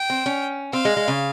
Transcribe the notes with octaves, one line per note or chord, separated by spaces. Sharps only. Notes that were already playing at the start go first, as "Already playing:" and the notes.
Already playing: G5
C4
C#4
C4 F5
G#3
G#3
C#3